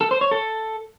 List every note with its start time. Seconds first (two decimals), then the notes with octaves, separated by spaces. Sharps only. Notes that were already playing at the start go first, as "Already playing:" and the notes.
0.01 A4
0.11 C5
0.21 C#5
0.31 A4